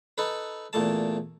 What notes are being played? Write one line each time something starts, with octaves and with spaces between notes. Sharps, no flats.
D#4 A4 B4
E2 A#2 A3 A5